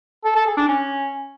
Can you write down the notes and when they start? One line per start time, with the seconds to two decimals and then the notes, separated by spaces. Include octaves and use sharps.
0.25 A4
0.36 A4
0.46 G#4
0.57 D4
0.68 C#4